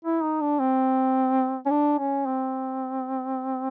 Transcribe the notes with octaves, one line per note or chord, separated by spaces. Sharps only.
E4
D#4
D4
C4
C#4
D4
C#4
C4